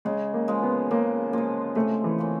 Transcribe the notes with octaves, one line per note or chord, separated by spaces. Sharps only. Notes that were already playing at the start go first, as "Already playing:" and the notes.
C#3 G#3
A#3
F3 G#3
B3
C#3 A#3
F3 G#3 A#3
C3 A3
E3
F3 A#3 C#4